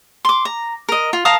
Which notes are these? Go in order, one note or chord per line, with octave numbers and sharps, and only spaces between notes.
C6 D6
A#5
A#4 D#5
F4
A#4 F5 A5 D#6